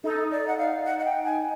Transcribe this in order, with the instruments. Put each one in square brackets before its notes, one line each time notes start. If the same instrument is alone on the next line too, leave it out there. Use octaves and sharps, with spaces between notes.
[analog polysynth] D#4 [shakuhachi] A4
[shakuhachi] D5
F#5
F5
F#5
F#5
G5
G#5